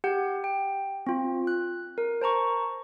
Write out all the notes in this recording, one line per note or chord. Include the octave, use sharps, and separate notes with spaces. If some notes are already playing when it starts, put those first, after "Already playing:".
G4 F#5 G6
G5
C4 F4
F#6
A#4
C5 A5 A#5 C#6